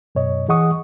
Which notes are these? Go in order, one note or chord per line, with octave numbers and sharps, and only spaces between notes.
F#2 B2 C#5 D#5
E3 G#4 D#5 F#5 C#6 D#6